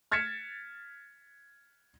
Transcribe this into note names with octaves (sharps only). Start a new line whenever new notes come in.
F6 G#6 A6 B6 C#7 E7